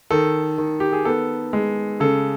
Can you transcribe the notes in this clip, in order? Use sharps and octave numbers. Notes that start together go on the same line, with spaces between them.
D#3 A4
D#3
G4
G#4
B3 A4
G#3
C#3 A4